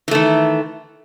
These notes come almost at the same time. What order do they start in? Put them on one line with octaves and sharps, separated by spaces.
E3 A3 D#3